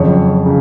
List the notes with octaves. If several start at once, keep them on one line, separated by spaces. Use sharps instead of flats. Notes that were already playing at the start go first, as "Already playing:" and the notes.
Already playing: F2 C#3 F#3 C#5
C#3